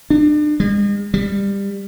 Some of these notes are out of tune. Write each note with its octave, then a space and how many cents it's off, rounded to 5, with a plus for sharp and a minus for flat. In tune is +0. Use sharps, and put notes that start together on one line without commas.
D4 +35
G#3 -45
G3 +20